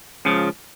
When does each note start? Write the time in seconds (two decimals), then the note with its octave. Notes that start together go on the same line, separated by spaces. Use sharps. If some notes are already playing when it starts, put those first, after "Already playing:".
0.25 C#2 C#3 F3